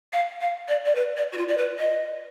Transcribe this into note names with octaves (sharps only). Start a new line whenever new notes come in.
F5
F5
D5
D5
B4
D5
F#4
F4
D5
B4
D#5